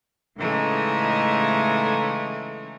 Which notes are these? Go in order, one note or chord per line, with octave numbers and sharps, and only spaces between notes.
A2 C#3 E3 G#3 A3 D#4